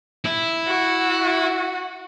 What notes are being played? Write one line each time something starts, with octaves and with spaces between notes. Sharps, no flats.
E4
F#4